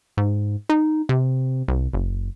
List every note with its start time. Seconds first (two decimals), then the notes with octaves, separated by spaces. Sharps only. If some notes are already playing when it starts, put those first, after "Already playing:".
0.17 G#2
0.69 D#4
1.09 C3
1.68 C2
1.94 F#1